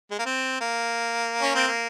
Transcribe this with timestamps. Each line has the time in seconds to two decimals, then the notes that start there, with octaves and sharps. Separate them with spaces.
0.11 G#3
0.19 A#3
0.25 C4
0.60 A#3
1.41 C#4
1.55 C4
1.67 A#3